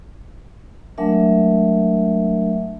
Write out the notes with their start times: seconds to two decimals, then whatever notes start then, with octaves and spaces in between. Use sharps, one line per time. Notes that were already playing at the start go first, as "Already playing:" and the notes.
0.98 F#3 G#3 A3 D4 A#4 E5